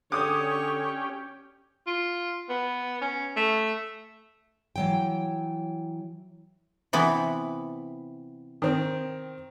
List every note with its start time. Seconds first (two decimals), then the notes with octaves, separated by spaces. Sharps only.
0.12 D3 C#4 G4 C#5 D6 D#6
1.86 F4
2.49 B3
3.01 C#4
3.36 A3
4.76 E3 F#3 G5
6.93 C3 E3 B3
8.62 D#3 C4